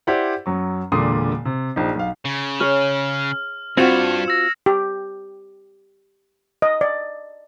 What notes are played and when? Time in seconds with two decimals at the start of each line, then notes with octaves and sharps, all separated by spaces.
0.07 E4 G4 C5 D5 F#5
0.46 F#2 F#3 C#6
0.92 E1 A#2 D3 C6 D#6 C7
1.45 C3
1.76 A#1 F3 D#4
1.96 B1 F5
2.25 C#3
2.60 G#4 C#5 F6
3.77 G2 C4 F4 F#4 G#6 C#7 E7
4.28 E6 A#6
4.66 G4
6.62 D#5
6.81 D5